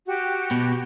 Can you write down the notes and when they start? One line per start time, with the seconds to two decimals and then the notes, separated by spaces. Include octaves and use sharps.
0.06 F#4 G4
0.51 B2